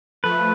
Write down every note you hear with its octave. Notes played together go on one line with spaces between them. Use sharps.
F3 A3 B4